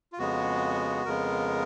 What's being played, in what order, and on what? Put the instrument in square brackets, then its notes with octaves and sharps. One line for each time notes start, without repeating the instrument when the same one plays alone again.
[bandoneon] F4
F2 C#3 G#3 B3 F#4
F2 C#3 G#3 B3 A#4